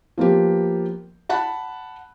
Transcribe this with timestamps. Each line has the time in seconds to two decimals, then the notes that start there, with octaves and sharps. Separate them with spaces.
0.18 F3 A#3 B3 G4
1.29 F#5 A5 B5 F#6